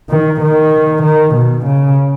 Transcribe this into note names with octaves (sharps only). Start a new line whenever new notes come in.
D#3
D#3
D#3
B2
C#3